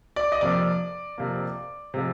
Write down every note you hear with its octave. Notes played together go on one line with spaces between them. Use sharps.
D5
D#5
F2 C3 F3 A#3 D5
F2 C3 F3 A#3
C3 F3 G#3